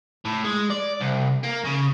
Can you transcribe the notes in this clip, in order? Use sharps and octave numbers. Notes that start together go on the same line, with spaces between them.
A2
G#3
D5
C2
A#3
C#3